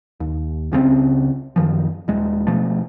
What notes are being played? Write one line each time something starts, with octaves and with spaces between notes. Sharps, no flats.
D#2
C#2 C#3 G#3 C4
F#2 D#3 F3
D#1 G#3
B2 F3 A3